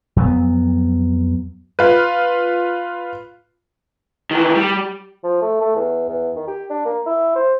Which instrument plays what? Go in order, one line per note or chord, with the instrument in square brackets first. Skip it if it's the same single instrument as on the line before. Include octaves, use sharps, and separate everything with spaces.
[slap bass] F2 F#3 B3
[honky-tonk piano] F4 B4
[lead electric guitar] D#3 E3
G3
[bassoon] F3
A3
A3
E2
E2
D#3
G4
D4
A#3
E4
C5